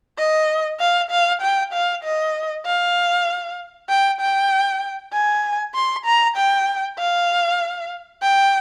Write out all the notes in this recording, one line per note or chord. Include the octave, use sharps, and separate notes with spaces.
D#5
F5
F5
G5
F5
D#5
F5
G5
G5
G#5
C6
A#5
G5
F5
G5